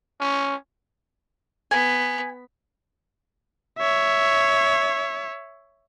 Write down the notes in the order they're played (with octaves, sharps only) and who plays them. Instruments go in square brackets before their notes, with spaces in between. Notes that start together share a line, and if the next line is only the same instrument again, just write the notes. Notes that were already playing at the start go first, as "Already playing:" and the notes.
[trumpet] C#4
[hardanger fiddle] B3 [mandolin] G#5
[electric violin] C#5 E5